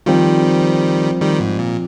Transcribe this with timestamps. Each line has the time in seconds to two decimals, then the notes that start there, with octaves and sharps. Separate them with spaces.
0.06 D#3 F3 G3 C4 F4
1.20 D#3 G3
1.40 G#2
1.59 A#2